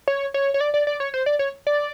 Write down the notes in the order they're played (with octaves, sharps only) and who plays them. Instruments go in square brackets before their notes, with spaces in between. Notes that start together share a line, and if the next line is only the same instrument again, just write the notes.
[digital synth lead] C#5
C#5
C#5
D5
D5
D5
C#5
C5
D5
C#5
D5